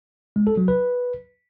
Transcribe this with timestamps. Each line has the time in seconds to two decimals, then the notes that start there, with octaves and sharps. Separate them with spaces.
0.36 G#3
0.47 A4
0.57 F#3
0.68 B4